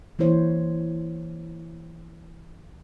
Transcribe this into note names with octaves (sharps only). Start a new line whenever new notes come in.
E3 A#3 E4 C5 C#5